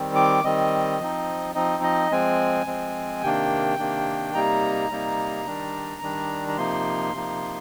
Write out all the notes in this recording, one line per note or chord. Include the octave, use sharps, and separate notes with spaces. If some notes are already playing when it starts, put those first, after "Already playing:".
Already playing: D#3 G3 C4
D6
D#3 G3 C4 D#5
F3 C4 D#4
F3 C4 D#4 D#5
D#5
F3 G#3 C4 G#5
F3 G#3 C4
C3 D#3 A#3 D4 G5
C3 D#3 A#3 D4
C3 G3 A#3 D#4 A#5
C3 G3 A#3 D#4
D#3 G3 D4
D#3 G3 D4
A#5
C3 F3 A#3 D#4 C6
C3 F3 A#3 D#4